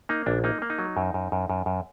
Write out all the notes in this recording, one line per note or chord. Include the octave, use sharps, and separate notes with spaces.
A#3 D#4
A#1 D4
A#3 D#4
A#3
D#4
F#3
F#2
F#2
F#2
F#2
F#2